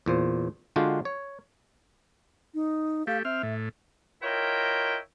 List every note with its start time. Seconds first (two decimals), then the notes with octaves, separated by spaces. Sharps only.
0.06 E2 A#2 C5
0.76 D3 G#3 D4 F4 F#4 G5
1.05 C#5
2.55 D#4
3.07 A3 G4 F5
3.25 C4 E5 F6
3.43 A2
4.23 E4 F4 A#4 C#5 D#5 G5